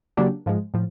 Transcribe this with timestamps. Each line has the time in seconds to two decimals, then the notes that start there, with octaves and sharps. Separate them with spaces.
0.17 C#3 F#3 A#3 D4 G4
0.46 G#2 F3 G#3
0.74 A2 F3